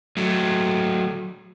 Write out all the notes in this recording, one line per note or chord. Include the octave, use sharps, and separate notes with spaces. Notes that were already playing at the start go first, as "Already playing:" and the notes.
F#3 A3